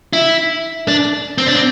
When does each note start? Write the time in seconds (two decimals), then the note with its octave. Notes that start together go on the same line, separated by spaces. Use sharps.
0.13 E4
0.88 D4
1.38 C4
1.47 D4
1.55 C4